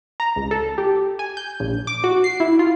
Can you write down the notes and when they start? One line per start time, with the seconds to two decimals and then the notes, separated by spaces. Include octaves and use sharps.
0.20 A#5
0.36 C#2
0.51 A4
0.78 G4
1.19 G#5
1.37 G6
1.60 A#1
1.87 D6
2.04 F#4
2.24 C7
2.40 E4
2.59 F4